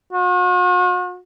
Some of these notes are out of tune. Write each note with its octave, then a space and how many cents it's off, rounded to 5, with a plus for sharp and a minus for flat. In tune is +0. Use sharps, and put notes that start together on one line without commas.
F#4 -45